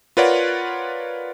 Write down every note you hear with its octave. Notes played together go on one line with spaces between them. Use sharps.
F4 A#4 B4 C#5 D5 F#5